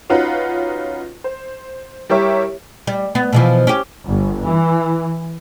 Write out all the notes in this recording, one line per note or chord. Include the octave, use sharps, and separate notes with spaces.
C#4 D#4 F4 F#4 B4 F#5
C5
G3 E4 G4 A#4 C#5 E5
G3
B3
B2 E3 F3
C#4 G4
G1
E3